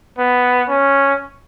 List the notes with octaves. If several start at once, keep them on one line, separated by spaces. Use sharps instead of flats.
B3
C#4